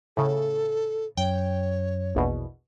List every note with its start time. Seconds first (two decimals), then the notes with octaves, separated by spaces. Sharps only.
0.17 A2 C#3 A4
1.17 F#2 C#5 G5
2.15 A#1 E2 B2